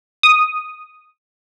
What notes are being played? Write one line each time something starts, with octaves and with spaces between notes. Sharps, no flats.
D#6